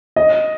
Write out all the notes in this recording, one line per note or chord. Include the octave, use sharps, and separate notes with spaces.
D#5